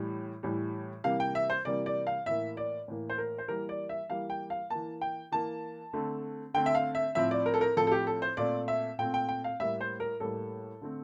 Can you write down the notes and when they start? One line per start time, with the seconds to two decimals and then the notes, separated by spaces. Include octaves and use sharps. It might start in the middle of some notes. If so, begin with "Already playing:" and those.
Already playing: A2 E3 G3
0.43 A2 E3 G3
1.04 C3 E3 G3 A#3 F5
1.20 G5
1.35 E5
1.50 C5
1.65 C3 E3 G3 A#3 D5
1.86 D5
2.07 F5
2.26 A2 E3 A#3 E5
2.57 D5
2.88 A2 E3 A#3
3.10 C5
3.18 A#4
3.38 C5
3.48 E3 G3 A#3 A#4
3.69 D5
3.89 E5
4.10 E3 G3 A#3 F5
4.30 G5
4.50 F5
4.70 E3 A#3 A5
5.01 G5
5.32 E3 A#3 A5
5.93 D3 A3 C4
6.54 D3 A3 C4 G5
6.66 E5
6.75 F5
6.95 E5
7.15 A2 F3 C4 E5
7.31 D5
7.46 A#4
7.54 A4
7.61 A#4
7.76 A2 F3 C4 A4
7.87 A4
7.91 G4
8.07 A4
8.22 C5
8.37 A#2 A3 C4 D5
8.68 E5
8.98 A#2 A3 C4 G5
9.14 G5
9.29 G5
9.44 F5
9.60 A2 G3 A#3 E5
9.81 C5
10.00 A#4
10.20 A2 G3 A#3 A4
10.81 D3 A3 C4